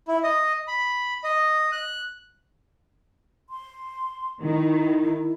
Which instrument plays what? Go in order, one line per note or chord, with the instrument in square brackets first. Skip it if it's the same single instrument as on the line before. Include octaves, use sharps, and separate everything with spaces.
[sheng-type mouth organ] E4
D#5
B5
D#5
F#6
[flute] C6
[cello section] D#3 [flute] E4